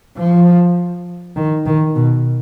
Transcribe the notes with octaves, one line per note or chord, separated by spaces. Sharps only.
F3
D#3
D#3
B2